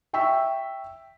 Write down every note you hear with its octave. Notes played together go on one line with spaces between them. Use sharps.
E5 G5 C#6 E6 B6